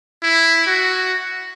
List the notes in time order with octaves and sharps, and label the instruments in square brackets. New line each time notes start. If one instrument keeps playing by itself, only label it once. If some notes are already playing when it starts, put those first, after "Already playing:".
[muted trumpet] E4
F#4